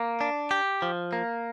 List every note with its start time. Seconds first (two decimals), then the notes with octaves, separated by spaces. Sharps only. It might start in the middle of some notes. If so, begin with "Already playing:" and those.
Already playing: A#3
0.21 D4
0.51 G4
0.82 F3
1.13 A#3